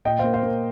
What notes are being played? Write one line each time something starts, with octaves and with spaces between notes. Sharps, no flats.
A#2 D#5 G5
A#3 C5 F5
C5 F5
A#3